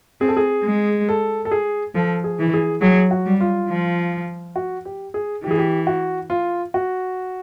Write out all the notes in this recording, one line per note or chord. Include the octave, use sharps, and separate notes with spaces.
C4 G#4
A4
G#4
G#3
A4
A4
G#4
F3 A4
G#4
E3
G#4
F#3 G#4
F#4
G3
F4
F3
F#4
G4
G#4
E3 G4
G#4
G4
F#4
F4
F#4